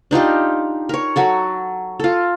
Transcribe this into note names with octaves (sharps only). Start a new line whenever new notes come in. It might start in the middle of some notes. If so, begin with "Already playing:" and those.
D4 D#4 F4 G4
A#4 C#5
F#3 F#4 A4
F4 A4